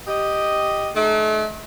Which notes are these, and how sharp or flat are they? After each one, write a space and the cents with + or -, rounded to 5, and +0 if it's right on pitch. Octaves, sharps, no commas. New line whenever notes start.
G4 +0 D#5 +0
A3 -40 D#4 -40